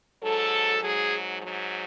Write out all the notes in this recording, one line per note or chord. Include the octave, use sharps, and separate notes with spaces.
G#2 F#3 A4
G#2 F#3 G#4
G#2 F#3